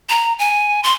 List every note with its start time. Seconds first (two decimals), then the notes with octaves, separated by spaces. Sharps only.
0.10 A#5
0.39 G#5
0.84 C6